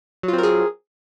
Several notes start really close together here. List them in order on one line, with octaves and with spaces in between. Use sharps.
F#3 F4 C4 A#4 G#4